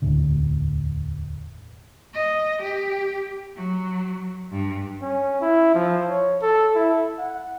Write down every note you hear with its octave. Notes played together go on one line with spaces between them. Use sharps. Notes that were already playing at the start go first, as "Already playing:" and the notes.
E1 D2 A2 D3
D#5
G4
F#3
G2
C#4
E4
F3
C#5
A4
E4
F#5